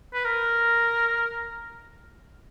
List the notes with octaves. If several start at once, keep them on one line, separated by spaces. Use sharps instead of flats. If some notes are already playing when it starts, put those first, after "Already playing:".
B4
A#4